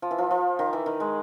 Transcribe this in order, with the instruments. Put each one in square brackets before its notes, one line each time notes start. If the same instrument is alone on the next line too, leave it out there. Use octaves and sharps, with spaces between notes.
[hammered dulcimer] F3
E3
F3
F3
D#3
E3
D#3
G#3